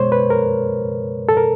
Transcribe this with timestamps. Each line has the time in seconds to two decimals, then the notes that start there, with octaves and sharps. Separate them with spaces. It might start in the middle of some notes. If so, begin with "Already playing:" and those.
Already playing: B2 G#3 C5 C#5
0.12 B4
0.30 A#4
1.29 A4
1.37 A#4